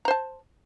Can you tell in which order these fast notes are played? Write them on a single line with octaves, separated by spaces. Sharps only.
A#5 C5 A5